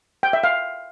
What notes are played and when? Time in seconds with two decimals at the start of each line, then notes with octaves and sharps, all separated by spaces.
0.23 G5
0.33 E5
0.44 F5